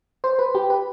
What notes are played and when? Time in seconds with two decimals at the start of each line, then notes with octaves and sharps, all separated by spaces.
0.24 C5
0.39 B4
0.55 G4
0.70 B4